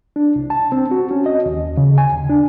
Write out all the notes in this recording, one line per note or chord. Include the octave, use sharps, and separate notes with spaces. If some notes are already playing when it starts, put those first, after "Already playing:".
D4
C2
A5
C4
F#4
C#4
D#5
D#2
C#3
G#5
D#2
D4